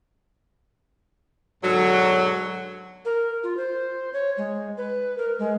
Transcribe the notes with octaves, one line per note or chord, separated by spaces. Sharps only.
G#2 B2 D3 F#3
A#4
F4
C5
C#5
G#3
B4
A#4
G#3